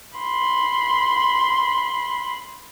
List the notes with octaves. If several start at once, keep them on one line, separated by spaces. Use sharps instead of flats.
B5 C6